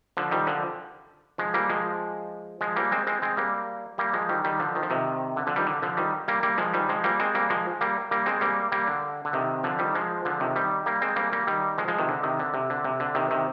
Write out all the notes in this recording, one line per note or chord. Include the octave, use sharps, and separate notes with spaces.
D3 F3
D#3 G3
D3 F3
F3 G#3
G3 A#3
F3 G#3
F3 G#3
G3 A#3
G#3 C4
G#3 C4
G#3 C4
G3 A#3
G3 A#3
F3 G#3
D#3 G3
D#3 G3
D3 F3
D#3
F3
C3 D#3
D3
D3 F3
D#3 G3
D3
D3 F3
D#3 G3
G3 A#3
G3 A#3
F3 G#3
D#3 G3
F3 G#3
G3 A#3
G#3 C4
G3 A#3
F3 G#3
G3 A#3
G3 A#3
G#3 C4
G3 A#3
G3 A#3
D3
D3
C3 D#3
D3 F3
D#3 G3
F3 G#3
D3 F3
C3 D#3
D#3 G3
G3 A#3
G#3 C4
G3 A#3
G3 A#3
D#3 G3
F3 G#3
F3 G#3
C3 D#3
D3
C3 D#3
D3
C3
D3
C3
D3
C3 D#3
C3 D#3